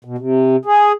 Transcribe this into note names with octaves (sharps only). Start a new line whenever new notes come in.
B2
C3
G#4